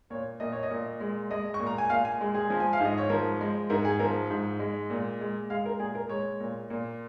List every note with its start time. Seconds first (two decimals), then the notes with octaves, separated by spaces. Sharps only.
0.10 A#2 C#5
0.40 A#2 D#5
0.52 C#5
0.63 D#5
0.71 A#2
1.00 G#3
1.30 G#3 D#5
1.54 C#6
1.60 A#2
1.67 A#5
1.78 G#5
1.90 A#2 F5
2.05 G#5
2.21 G#3
2.35 G#4
2.50 F3
2.60 G#5
2.73 F5
2.80 G#2 D#5
2.98 C#5
3.10 F3 A#4
3.41 G#3
3.70 G#2 A#4
3.85 G#4
4.00 F3 A#4
4.30 G#2
4.59 G#3
4.90 A#2
5.21 G#3
5.50 G#3 F5
5.66 A#4
5.79 A#2 G#4
5.95 A#4
6.09 G#3 C#5
6.40 A#2
6.70 A#2